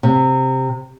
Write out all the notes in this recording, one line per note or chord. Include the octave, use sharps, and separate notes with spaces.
C3